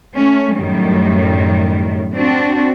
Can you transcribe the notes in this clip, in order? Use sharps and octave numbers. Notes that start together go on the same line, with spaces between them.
A3 C#4
F#2 A2 D#3 G3
C4 D4 F#4